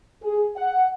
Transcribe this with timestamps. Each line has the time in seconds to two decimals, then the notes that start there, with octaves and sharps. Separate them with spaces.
0.22 G#4
0.57 F#5